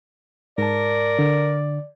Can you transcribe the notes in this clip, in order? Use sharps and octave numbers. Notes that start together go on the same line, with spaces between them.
G#2 A#4 D5 A5
D3